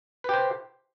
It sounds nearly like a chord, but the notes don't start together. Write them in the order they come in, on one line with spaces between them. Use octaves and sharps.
B4 G4 C5